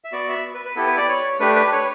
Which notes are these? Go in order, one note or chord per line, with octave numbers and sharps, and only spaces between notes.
E5
B3 F#4 D5
E5
B4
B4
B3 E4 G4 A4
B4
D5
C#5
A3 D4 G4 B4
B4
C#5